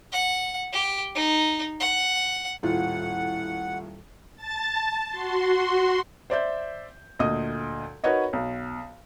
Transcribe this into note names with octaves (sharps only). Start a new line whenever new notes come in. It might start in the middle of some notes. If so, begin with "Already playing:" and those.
F#5
G4
D#4
F#5
D#1 A2 F4 F#5
A5 A6
F#4 C6
C5 D5 E5 G6
D2 A#2 D#5 D#6
D#4 F#4 A#4 B4 C#5 D#5
B1